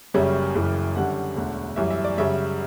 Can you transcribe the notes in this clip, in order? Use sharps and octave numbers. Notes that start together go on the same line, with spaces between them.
F#1 F#2 C#3 G3 C#4 E5
F#1 F#2 C#3 E3
F#2 D3 G3 C#4 F#5
E1 D2 D3
F#2 E3 G3 E5
E5
D5
F#2 C#3 G3 E5